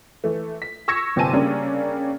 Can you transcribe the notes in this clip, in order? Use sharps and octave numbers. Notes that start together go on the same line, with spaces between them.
E3 A3
B6
C#6 E6 G#6 A#6 C#7
G1 C3 C4 G#5 A5 D#7
C#3 G3 A#3 C#4 D4